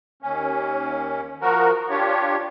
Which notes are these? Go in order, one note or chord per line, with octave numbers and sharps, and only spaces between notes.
D#2 C#4
F3 F#4 A#4
D4 F4 G4 C#5